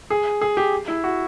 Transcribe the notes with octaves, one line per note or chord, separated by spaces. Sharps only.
G#4
G#4
G4
E4
F#4